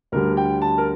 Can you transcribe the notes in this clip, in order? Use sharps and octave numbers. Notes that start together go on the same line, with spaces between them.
D2 D3 G3 A#4
G5
A5
A#4